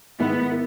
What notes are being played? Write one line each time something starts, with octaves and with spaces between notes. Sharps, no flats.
G#2 D#3 A#3 B3 E4 A#4
E4 A#4